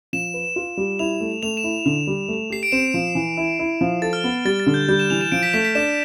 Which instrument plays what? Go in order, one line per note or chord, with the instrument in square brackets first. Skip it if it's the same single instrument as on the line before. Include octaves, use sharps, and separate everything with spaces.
[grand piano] F3 [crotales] E7
[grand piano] B4
F4
G3
[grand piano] E4 [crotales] F7
[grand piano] A3
[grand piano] A3 [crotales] F7
[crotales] E7
[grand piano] E4
D3
G3
A3
[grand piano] G4 [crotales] C7
[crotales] D7
[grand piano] C4 [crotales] E7
[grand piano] F3
E3
E4
E4
F3
[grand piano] A4 [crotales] A6
[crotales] F6
[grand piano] B3
[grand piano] G3 [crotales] A6
[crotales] A6
[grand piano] D3
[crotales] G6
[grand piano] G3 [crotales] G6
[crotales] E7
[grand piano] E3 [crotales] F7
[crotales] E7
[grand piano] F3 [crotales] D7
[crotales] B6
[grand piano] A3 [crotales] B6
[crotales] B6
[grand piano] D4 [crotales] E7